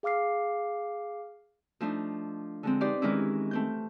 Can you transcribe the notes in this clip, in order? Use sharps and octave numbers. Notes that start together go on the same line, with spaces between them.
G#4 F5 D6 F6 C7
F3 A3 D4 D#4
D3 G#3 C4
D#4 G4 B4 C5 D5
D#3 E3 G#3 C#4 E4
A3 C4 G6